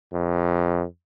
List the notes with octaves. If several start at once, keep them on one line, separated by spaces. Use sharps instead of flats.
F2